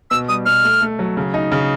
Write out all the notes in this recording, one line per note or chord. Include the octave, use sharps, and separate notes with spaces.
B2 E6
G3 D#6
B2 F6
A3
A3
F#3
C#3
D#4
C#3